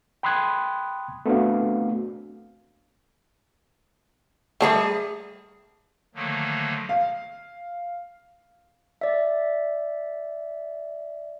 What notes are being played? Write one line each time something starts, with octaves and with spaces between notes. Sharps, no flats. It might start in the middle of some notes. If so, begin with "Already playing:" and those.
G5 B5 C6 D#6 F#6 G#6
A3 B3 C4 D4 F#4 F5
G3 A3 G#4 A5 A#5
D3 D#3 F3 F#3 A3 A#3
F5
D5 E5